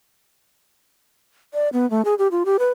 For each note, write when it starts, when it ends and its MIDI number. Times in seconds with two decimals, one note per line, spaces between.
1.54 1.69 74
1.73 1.89 59
1.90 2.02 57
2.05 2.14 68
2.19 2.28 67
2.31 2.43 65
2.45 2.57 67
2.59 2.71 71